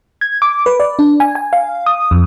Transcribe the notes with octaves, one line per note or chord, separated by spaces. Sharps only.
G#6
D6
B4
D5
D4
G#5
G#5
F5
D#6
F2